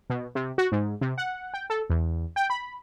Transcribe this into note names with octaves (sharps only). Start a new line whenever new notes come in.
B2
C3
F#4
G#2
C3
F#5
G5
A4
E2
G5
B5